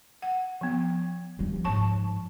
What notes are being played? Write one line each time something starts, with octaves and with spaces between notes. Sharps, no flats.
F#5
F3 B3
G2 F3
G#2 F3 C#5 A5 C#6